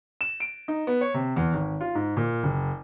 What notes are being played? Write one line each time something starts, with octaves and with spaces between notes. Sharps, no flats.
E7
D7
D#4
B3
C#5
C3
E2
G#1
F4
G#2
A#2
F#1